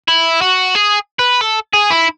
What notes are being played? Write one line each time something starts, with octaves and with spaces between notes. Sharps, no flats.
E4
F#4
G#4
B4
A4
G#4
E4